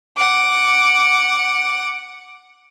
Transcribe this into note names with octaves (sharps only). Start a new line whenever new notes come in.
F#5 D6